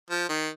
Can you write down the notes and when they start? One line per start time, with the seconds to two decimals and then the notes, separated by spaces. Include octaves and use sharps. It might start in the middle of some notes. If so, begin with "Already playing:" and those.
0.10 F3
0.29 D#3